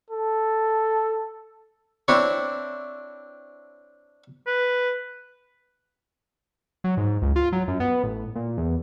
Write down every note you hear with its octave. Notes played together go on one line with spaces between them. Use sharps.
A4
C4 D4 E4 C#5
B4
F#3
G#2
C#2
F4
F#3
F#2
B3
A1
A#2
E2